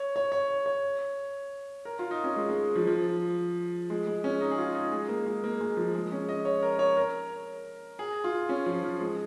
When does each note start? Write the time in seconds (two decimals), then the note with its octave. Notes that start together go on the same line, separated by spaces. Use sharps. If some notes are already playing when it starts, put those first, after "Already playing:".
Already playing: C#5
0.16 C#5
0.32 C#5
0.66 C#5
1.85 A#4
1.99 F4
2.11 D#4
2.24 C#4
2.36 G#3
2.49 G#3
2.75 F3
2.87 F3
3.90 G#3
4.07 G#3
4.24 C#4
4.41 D#4
4.51 G#4
4.58 F4
4.75 D#4
4.92 G#3
5.09 A#3
5.26 G#3
5.44 A#3
5.61 G#3
5.77 F3
5.94 G#3
6.12 C#4
6.29 D#5
6.45 C#5
6.62 A#4
6.79 C#5
6.97 A#4
7.99 G#4
8.24 F4
8.49 C#4
8.66 F3
8.83 F3
9.01 G#3